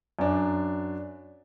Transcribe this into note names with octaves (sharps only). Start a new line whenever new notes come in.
F#2 D4